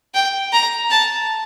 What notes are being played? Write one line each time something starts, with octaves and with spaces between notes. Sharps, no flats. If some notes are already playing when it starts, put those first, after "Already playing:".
G5
A#5
A5